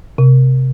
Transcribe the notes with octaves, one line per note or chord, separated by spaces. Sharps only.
C3